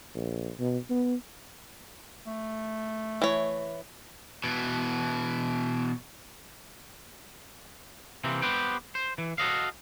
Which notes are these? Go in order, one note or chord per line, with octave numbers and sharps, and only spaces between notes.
A#1
B2
B3
A3
E3 C#5
B2 E3
C3 E3 A#3 C4
B3 G4 B4 C5 G5
C5
E3
F#4 A4 D#5 F5